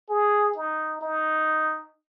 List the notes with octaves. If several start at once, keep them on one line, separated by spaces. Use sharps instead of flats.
G#4
D#4
D#4